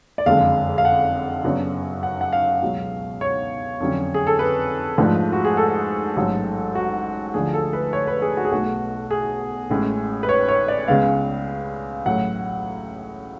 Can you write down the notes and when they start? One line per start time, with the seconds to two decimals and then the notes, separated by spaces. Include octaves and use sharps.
0.18 D5
0.26 F#1 F2 D3 G#3 F5
0.78 F5
0.85 F#5
1.44 F#2 C#3 F#3 B3 D4
2.03 F#5
2.21 F#5
2.33 F5
2.62 C#2 B2 F#3
3.21 C#5
3.80 F2 D3 F#3 C#4
4.14 G#4
4.27 A4
4.39 B4
4.98 G#2 F3 A3 D4
5.33 F#4
5.45 G#4
5.57 A4
6.16 A1 G#2 F#3
6.75 F#4
7.34 D2 D3 F3 A3 G#4
7.54 A4
7.73 B4
7.93 C#5
8.07 B4
8.22 G#4
8.37 F#4
8.45 G#4
8.52 B1 B2 A3 F#4
9.11 G#4
9.70 A1 A2 G#3 C#4
10.23 B4
10.29 C#5
10.48 C#5
10.68 D5
10.88 C#2 C#3 G#3 B3 F5
12.06 A1 A2 F#3 F#5